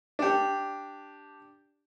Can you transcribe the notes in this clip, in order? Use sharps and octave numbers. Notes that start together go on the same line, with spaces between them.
D4 G4